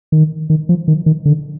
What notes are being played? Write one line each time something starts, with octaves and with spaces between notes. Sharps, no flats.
D#3
D#3
F3
D#3
D#3
D3